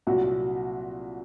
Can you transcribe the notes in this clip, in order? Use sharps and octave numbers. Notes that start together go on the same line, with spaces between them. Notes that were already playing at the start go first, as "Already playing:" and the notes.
C2 A#2 F#3 F#4